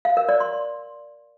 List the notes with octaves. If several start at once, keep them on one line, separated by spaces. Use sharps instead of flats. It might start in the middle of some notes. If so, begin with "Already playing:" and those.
F5
A#4
D5
C6